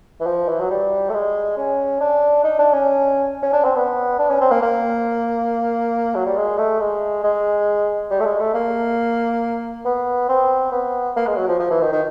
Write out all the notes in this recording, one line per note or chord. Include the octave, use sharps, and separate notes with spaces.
E3
F3
E3
F#3
G3
A3
G#3
C#4
D4
D#4
D4
C#4
C#4
D4
C4
B3
D4
C#4
C4
A#3
A#3
F#3
G3
G#3
A3
G#3
G#3
G3
A3
G#3
A3
A#3
B3
C4
B3
A#3
G#3
F#3
F3
F3
E3
D#3
D#3